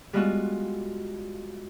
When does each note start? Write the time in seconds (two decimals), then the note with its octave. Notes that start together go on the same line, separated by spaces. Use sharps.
0.13 G3 G#3 B3 F4 F#4